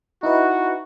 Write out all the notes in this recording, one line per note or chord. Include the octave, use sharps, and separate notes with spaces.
D#4 E4 F#4 B4